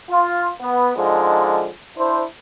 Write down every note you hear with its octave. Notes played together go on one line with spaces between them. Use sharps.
F4
B3
D3 F3 G#3 D#4
D4 E4 C5